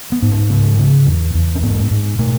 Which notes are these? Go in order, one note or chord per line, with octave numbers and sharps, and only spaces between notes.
B3
G#2
C#4
C#3 B3
C#3
E2
E2
C#4
G#2 B3
G#2
B2 A3